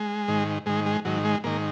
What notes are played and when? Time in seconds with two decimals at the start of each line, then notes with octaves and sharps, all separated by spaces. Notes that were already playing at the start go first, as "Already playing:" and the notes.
Already playing: G#3
0.28 G#2 D#3
0.66 G#2 D#3 G#3
0.86 G#3
1.05 G#2 D#3 F#3
1.25 G#3
1.44 G#2 D#3 A#3